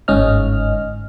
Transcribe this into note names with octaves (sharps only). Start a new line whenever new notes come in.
G1 G#2 C#4 D#5 F6